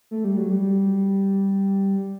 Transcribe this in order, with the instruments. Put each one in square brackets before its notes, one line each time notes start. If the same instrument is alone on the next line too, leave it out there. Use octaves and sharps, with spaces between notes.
[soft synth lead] A3
G3
F#3
G3